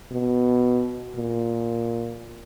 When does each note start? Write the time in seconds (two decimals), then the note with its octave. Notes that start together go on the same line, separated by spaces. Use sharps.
0.12 B2
1.16 A#2